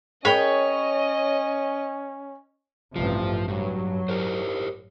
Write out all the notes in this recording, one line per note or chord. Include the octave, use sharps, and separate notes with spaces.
C#4 G#4 A#4 C#5 D#5 G5 B5
A1 G2 C3 F3
G2 F#3
G4 A#4 C5